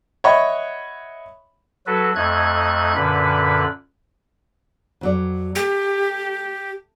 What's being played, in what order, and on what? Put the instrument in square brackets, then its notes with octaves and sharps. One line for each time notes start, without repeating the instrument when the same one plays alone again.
[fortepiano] C#5 D#5 E5 F#5 B5 C#6
[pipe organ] F#3 F#4 A4 B4
F2 A3 D#4 F#6 G#6
F#2 A#2 D3 B4 B5
[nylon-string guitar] F2 F#3 D5
[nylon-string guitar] A3 [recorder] G4